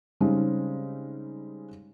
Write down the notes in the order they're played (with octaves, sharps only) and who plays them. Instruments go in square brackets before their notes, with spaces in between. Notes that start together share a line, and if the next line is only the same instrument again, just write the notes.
[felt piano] C#3 G3 G#3 C4 C#4 D#4